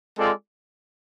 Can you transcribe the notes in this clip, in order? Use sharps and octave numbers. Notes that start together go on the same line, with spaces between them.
G#3 C4 F4 A4 D5